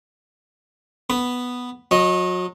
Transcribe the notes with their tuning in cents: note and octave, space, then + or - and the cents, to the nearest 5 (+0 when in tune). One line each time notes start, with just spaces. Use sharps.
B3 +0 B5 +0
F#3 -35 D#5 +0